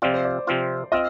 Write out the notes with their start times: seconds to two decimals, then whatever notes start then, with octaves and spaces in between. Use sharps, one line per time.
0.02 C3 F3 C4 F4 D5
0.14 C5
0.25 D5
0.47 C3 F3 C4 F4
0.92 C4 F4 D#5